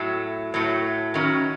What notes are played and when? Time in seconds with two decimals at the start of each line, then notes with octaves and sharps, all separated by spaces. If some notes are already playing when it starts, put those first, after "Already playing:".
Already playing: A2 F#3 A3
0.54 A2 F#3 A3
1.14 D#3 F#3 C#4